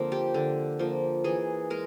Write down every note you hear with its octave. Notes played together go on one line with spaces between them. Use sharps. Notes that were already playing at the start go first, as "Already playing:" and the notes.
Already playing: D3 F3 A#3 C4
G4
D3
F3 A#3
E3 G#4
G#3 A#4